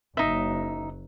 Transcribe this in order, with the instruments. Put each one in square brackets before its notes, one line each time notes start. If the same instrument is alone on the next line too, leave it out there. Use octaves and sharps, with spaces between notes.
[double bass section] F#1 F#3 [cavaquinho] D#4 E5